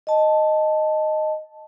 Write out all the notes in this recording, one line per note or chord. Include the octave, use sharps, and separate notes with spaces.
D#5 A5